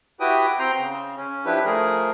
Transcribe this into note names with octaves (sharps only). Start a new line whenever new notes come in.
E4 F#4 G4 B4 G5 D#6
C4 G5 A#5 C6 G6
C#3
C#4
F3 D4 E4 G4 B4
F3 A3 G#4 A#4